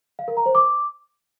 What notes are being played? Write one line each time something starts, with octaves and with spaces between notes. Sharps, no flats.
F5
A#4
A#5
C5
D6